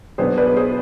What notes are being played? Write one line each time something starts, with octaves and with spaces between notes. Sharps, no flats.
B1 B2 B3 D4 G#4 C5
B4 D5
G#4 C5